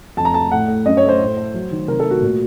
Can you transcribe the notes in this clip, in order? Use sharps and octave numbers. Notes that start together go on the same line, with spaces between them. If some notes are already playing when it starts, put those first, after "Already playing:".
F2 A5
A#5
A3 A5
A2 F#5
A3
F#2 D#5
C#5
A3
C5
A2
A3
F#3
D#3
C3 A#4
A4
A3
F#4
A#2